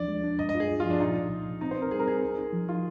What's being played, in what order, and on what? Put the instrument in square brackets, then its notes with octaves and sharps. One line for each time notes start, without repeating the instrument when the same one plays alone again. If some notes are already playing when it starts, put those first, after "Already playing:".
Already playing: [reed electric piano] D#2 F3 D4 [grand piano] D5
[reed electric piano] G#3
D4
[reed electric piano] G2 [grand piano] D#5
[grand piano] D#5
[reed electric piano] F4
[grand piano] G#4
[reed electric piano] G2
[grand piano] F4
[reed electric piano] F3
[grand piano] D4
[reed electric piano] A#2 [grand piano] D#4
[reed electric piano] C2
C2
C2
[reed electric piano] C4 [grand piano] D#4
[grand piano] C5
[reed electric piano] C4
[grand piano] A#4
[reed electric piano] G3 [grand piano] G#4
[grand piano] A#4
[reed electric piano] C4 [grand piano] G#4
[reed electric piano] D#4
D#4
F3
[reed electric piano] D#4 [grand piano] F4